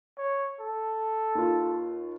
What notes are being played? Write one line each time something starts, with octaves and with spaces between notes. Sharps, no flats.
C#5
A4
D#2 F4